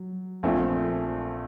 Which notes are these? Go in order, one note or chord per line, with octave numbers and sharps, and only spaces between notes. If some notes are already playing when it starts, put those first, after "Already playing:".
Already playing: F#3
A#1 A#2 A3 C4